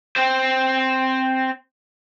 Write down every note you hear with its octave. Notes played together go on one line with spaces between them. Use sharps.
C4 C5